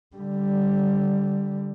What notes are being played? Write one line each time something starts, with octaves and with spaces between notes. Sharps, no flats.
D3 G3